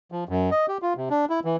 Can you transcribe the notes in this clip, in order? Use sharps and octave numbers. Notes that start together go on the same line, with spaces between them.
F3
F#2
D#5
G4
F4
C3
D4
E4
E3